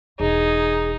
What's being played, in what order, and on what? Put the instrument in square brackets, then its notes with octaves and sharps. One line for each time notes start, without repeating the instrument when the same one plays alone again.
[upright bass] E1 [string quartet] D#4 [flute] G#4